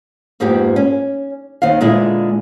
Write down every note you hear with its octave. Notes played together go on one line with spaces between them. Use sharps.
F2 G#2 F3 A#3 B3 G4
C#4
D#2 D#3 C4 F5
A#2 D3 G#3 B3 E4 F4